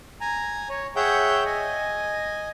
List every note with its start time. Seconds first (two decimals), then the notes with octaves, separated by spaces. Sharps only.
0.21 G#5 A#5
0.69 C#5
0.96 G#4 C#5 E5 F#5 G5 G6
1.45 D#5 G#5